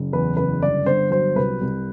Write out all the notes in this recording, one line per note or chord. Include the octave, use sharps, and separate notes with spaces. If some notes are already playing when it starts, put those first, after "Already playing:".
Already playing: F#1
E2 B4
F#1 B4
G1 D5
G1 C5
F#3 C5
C2 B4
C2